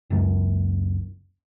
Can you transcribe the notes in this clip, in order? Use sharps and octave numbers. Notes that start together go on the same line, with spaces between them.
F#1 C#2 F#2